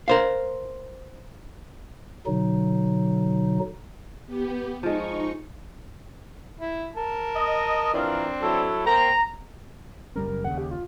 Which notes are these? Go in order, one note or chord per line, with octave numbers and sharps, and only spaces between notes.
A#4 C5 F5
B2 D3 F#3 D#4
B3 G4
F3 G#3 D#4 C#6
E4
A#4 A5
D#5
E3 C4 D4 F4 A#4
F#3 E4 A4
A#3 C5 G5 A#5
F#1 G3 C#4 A#4
D#2 C#3 F#5
G4
F4